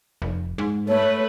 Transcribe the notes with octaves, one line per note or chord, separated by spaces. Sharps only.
F1
G#2
A3 B4 C#5